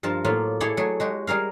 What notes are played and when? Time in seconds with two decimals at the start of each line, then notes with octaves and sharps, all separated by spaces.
0.03 G2 F3 A#4 A5
0.25 A2 F#3 A#3 F4
0.60 E4 G#4 A4 C#5 D5
0.77 F#3 A3 G#4
1.00 G#3 F#4 G4
1.27 G3 G#4 A#4 F5